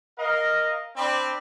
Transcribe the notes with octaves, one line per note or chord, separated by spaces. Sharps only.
A#4 D#5 F5
C4 D4 D5 B5